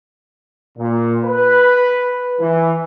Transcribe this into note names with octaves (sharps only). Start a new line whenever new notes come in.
A#2
B4
E3